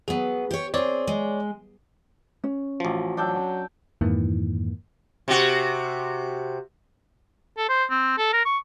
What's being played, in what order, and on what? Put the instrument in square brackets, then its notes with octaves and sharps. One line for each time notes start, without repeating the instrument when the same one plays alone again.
[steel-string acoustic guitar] F#3 B3 [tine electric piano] G#4
[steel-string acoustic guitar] G4 C#5
[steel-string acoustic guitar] C4 G#4 [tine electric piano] C#5 D5
[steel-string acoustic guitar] G#3
[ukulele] C#4
[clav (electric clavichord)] A1 F3 [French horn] F#4
[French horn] F#3 [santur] D4 G5 E6
[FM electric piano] F2 G#2 D#3 E3 A#3
[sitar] C3 F#4
[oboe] A4
C5
C4
A4
A#4
C#6